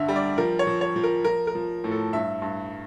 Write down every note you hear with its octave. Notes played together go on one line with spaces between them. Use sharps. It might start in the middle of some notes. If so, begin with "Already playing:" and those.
Already playing: G2 D3 E5
G3
D5
F3 A#4
C#5
F3
C#5
F3
A#4
F3 A#4
A#4
F3
A2
A4
G2 E5
G2